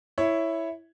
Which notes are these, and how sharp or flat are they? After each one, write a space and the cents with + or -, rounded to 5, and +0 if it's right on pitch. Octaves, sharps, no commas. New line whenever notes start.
E4 +0 C#5 +0